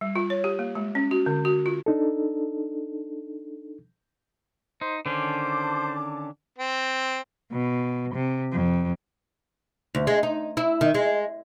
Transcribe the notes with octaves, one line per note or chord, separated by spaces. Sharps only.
G3
F4
C#5
G4
A#3
G#3
C#4
F#4
D3
F#4
F4
D4 D#4 A4
D#4 C5
D3 D#3 C#4 C5 A5 D6
C4
B2
C3
F2
D2
G#3
D#4
E4
D#3
G#3